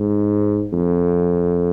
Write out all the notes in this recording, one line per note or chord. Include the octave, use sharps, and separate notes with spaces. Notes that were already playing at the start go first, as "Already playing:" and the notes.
Already playing: G#2
F2